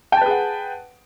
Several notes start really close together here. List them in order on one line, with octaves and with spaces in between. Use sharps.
G5 A5 B4 G#4 F#5